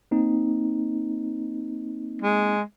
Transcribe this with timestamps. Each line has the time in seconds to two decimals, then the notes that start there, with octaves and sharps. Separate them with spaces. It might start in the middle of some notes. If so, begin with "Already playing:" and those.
0.11 A#3 C4 D#4
2.22 G#3